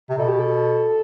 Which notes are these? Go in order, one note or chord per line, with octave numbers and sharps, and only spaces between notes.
C3
B2 A4
G4
A4